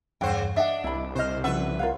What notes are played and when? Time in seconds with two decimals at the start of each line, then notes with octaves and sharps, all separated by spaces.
0.21 E2 G2 C#3 C5 F#5 G5
0.56 D4 D#5 E5 F#5
0.84 C2 E4 B5
1.16 C3 B4 C5 D#5 F6
1.44 C#3 F3 B4 D5 E5 F#5
1.79 F4 A#4 C#5 F5 F#5